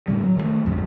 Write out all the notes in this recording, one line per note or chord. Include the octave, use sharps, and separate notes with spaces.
A2 D3 G3
F#3
D#3 E3 A3
A1 F2 G#2 D3